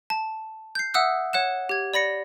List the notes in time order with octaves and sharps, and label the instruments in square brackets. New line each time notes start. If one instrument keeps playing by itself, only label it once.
[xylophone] A5
G6 C7
E5 F#5 D#6 E6 F#6
C#5 F#5 F#6 E7
G4 G#6
D5 B5 A#6 C#7